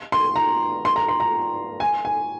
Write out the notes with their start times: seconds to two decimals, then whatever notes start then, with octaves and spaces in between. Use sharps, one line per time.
0.12 C6
0.36 A#5
0.85 C6
0.96 A#5
1.08 C6
1.20 A#5
1.80 G#5
2.05 G#5